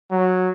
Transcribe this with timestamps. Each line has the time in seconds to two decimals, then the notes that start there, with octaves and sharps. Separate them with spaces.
0.11 F#3